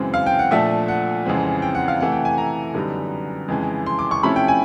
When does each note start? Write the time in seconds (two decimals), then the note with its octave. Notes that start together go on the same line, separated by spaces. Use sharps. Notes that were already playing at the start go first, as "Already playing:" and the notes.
Already playing: F#2 C#3 E3 G#3 C4
0.14 F5
0.26 G5
0.39 F#5
0.51 A#2 F3 A3 D4 E5
0.88 F#5
1.26 F2 C#3 E3 G#3 C4
1.62 G5
1.75 F#5
1.88 F5
2.00 C3 E3 A3 F#5
2.12 G5
2.25 G#5
2.38 A#5
2.74 F#2 D3 G3 B3 D#4
3.48 F2 C#3 E3 G#3
3.86 C6
3.99 D6
4.11 C#6
4.23 C3 F3 A3 C#4 E4 B5
4.36 G5
4.48 G#5